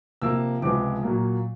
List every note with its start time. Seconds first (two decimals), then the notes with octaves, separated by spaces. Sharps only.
0.22 C3 F3 A#3 E6
0.62 C#2 C3 F3 G#3 B3 D6
1.03 A#2 F#3 A#3